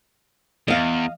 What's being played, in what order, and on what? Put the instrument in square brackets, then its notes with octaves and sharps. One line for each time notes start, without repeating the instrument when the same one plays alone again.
[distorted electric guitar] E2 [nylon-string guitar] D#5 F5